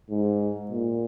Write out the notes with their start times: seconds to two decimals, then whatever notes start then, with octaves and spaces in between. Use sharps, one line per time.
0.10 G#2
0.71 A#2